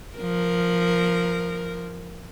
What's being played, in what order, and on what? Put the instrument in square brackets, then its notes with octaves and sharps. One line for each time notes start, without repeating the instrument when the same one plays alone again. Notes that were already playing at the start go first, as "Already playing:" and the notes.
[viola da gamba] F3 A#4